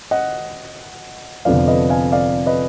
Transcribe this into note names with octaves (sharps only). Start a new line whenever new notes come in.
D#5 F#5
F1 F2 D3 F3 B3 D5 F5
B4 D#5
F5 G#5
D5 F5
B4 D#5